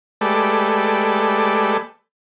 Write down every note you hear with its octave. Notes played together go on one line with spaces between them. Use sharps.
G#3 A3 G4 A4 B4 D5